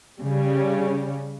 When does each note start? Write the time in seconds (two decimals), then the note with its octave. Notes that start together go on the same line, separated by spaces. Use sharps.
0.22 C#3 G3 C#4